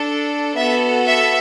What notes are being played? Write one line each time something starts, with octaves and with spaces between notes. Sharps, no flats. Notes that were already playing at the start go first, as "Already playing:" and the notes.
Already playing: D4 A4
B3 F#4 A4 E5
E5